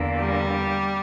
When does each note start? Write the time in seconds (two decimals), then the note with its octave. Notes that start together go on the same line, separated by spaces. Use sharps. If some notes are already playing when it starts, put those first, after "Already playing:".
Already playing: E2 D3 A#3
0.20 G3 G4